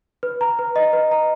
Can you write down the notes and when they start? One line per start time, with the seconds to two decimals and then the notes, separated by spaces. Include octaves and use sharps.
0.23 B4
0.41 A#5
0.59 B4
0.76 D#5
0.93 B4
1.11 A#5